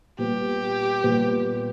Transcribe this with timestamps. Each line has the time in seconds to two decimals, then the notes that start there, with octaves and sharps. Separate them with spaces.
0.18 A#2 G3 B3 G4
1.03 A#2 G3 B3